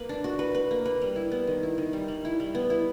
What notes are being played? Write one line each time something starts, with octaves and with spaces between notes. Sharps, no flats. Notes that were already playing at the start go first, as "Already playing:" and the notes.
Already playing: A#3 B4
D4
F#4
B4
B4
A#3
B4
G3
E4
B3
D#3
E4
D#3
G3
G3
E4
G3
B3
E4